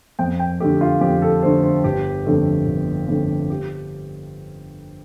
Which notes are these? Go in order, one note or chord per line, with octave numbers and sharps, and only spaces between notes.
F2 G5
G5
D3 A3 G4
F4
F2 G4
A4
D3 A3 C5
C5
G1 G4
F2 D3 A3
G1
F2 D3 A3
G4